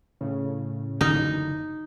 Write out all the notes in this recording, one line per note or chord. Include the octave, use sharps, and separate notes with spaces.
A2 C#3
F#1 D3 E3 D#4